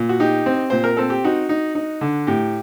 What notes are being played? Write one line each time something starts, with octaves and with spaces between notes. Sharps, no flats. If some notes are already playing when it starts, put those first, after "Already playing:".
Already playing: A#2
F#4
D#4 G4
C4
A#2 C5
A#4
C4 A4
G4
D#4 F#4
D#4
D#4
D3
A2 G4